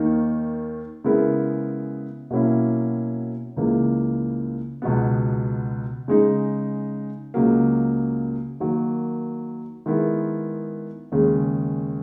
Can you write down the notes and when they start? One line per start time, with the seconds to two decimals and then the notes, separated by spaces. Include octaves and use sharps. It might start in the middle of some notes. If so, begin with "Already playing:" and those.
Already playing: D#2 D#3 A#3 D#4
1.04 C#3 G#3 B3 E4 A#4
2.30 B2 F#3 A#3 C#4 E4
3.57 C#2 C#3 E3 A#3
4.82 C#2 B2 F#3 B3
6.08 C#3 G#3 D#4
7.34 C#2 C#3 F#3 A#3
8.60 D#3 F#3 A#3
9.86 D#3 G#3 B3 E4 A#4
11.12 D#2 C#3 G#3